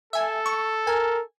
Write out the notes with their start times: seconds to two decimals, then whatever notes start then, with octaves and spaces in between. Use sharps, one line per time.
0.13 A4 E5 G#5
0.46 C#6
0.87 A#4 G#5